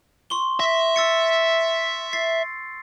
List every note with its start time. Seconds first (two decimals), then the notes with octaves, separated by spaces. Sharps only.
0.30 C6 C#6 G7
0.60 E5 A#6
0.96 E6 A6 C#7
2.13 A6 C7